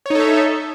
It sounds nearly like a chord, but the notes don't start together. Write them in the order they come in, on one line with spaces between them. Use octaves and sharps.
C#5 D#4 A4 E5